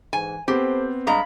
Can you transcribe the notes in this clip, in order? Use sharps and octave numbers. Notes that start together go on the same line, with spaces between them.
G#2 E3 G#5
B3 C4 G4 A4 B4 C5
G2 G#3 F5 A#5 B5